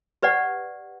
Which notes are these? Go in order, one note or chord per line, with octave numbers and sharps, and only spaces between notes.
G4 B4 D5 F#5